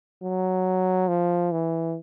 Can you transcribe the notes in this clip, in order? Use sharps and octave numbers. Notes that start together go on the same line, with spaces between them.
F#3
F3
E3